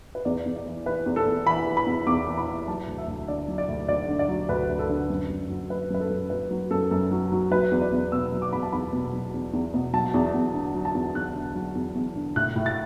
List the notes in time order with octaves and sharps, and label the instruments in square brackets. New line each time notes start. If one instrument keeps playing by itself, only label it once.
[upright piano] B4
E2 D5
E2
D5
E3
E3 B4
E2
A4
E2
E3 B5
E3
B5
E2
E2 D6
E3
B5
E3
F#3 A5
D2
E5
D2
D3 D5
F#3
D5
D2
D2 D5
D3
D5
F#3
D2 B4
D2
A4
D3
F#2
F#2
F#3
F#3 B4
F#2 B4
A4
F#2
F#3 B4
F#3
F#2 A4
F#2 A4
F#3
F#3
F#3 B4
E2
D5
E2
B2 E6
F#3
D6
E2 B5
A5
E2 B5
B2
F#3
E2
E2
B2
F#3 A5
E2
E2
D3
F#3
A5
E2
E2 F#6
D3
F#3
E2
E2
D3
A2 F#6
A2
A6